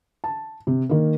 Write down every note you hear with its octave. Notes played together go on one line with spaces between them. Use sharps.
A5
C3
D#3 A#3